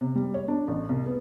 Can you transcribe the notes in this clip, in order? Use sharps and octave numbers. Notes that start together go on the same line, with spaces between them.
C3
G3
C#5
D4
A1
C2
B3